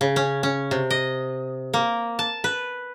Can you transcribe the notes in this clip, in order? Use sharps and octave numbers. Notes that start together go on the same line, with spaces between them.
C#3
C#4
C#4
C3
D#5
A#3
A5
B4